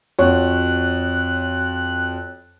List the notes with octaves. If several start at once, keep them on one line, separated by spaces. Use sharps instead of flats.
F2 F#4 C#5 F#6